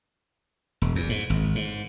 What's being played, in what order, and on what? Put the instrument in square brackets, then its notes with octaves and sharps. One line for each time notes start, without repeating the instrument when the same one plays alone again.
[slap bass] E1
E2
G#2
G#1
G#2